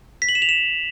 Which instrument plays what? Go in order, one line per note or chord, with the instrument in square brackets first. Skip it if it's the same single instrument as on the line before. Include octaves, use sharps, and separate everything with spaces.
[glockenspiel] B6
F#7
E7
F7
E7